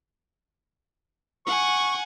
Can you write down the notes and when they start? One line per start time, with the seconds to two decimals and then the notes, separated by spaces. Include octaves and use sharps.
1.46 F#5 G#5 C#6